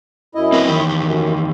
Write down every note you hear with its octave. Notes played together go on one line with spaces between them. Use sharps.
F#2 E4 D#5
C4 A#4 B4
E2 D#3 G4
F#2